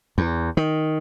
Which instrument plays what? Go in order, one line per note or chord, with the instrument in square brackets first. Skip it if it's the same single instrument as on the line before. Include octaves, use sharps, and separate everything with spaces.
[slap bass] E2
D#3